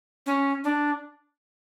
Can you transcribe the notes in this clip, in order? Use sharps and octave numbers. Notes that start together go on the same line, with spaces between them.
C#4
D4